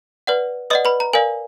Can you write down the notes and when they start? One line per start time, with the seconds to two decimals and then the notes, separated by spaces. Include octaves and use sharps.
0.27 B4 D5 F#5
0.70 B4 D5 D#5 F#5 D#6
0.85 B4 B5
1.00 A#5
1.13 A#4 D5 F5 G#5